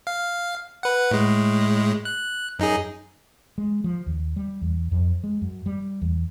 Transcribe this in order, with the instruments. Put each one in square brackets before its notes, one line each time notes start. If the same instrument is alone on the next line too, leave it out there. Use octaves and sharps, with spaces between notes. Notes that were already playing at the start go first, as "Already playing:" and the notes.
[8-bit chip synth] F5
B4 F#5
A2 G#3
F#6
F#2 D#4 G#4
[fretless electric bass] G#3
F3
D#2
G3
E2
F2
G#3
F#2
G3
E2